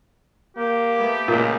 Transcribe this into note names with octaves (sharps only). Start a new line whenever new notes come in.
A#3 G4
A3 B3
C#2 A#2